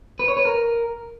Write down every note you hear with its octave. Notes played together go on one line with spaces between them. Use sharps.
B4
C#5
B4
A#4